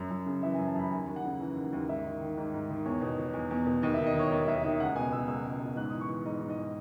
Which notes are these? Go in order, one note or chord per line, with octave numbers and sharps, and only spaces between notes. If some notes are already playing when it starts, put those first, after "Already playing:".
Already playing: F#2
F#2
C#3
E3 E5
G#5
F#2
A5
F#2 B5
D#2 G#5
D#2
F#5
C#3
E3
D#2
D#2
G#2 E5
D#3
D#3
G#2
G#2
D#3
E2 C#5
B2
B2
E2
E2
B2
D#2 D#5
E5
D#3
D#5
D#3 C#5
D#2 D#5
D#2 E5
D#3 E5
C#2 F#5
B2 G#5
B2 E6
C#2 E6
C#2
B2
G#2 F#6
D#6
E3
C#6
E3
G#2 D#5
G#2
D#5
E3